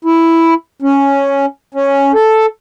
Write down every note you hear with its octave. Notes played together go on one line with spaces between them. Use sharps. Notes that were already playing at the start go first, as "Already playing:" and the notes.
E4
C#4
C#4
A4